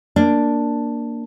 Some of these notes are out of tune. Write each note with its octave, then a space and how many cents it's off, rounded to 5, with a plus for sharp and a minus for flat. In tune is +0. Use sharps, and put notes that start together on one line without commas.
A#3 +0 D4 +0